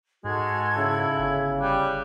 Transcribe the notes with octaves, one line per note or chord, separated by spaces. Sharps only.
G#2 G#3 F#4 A4 G#6
C#3 E4
G1
G3 F#6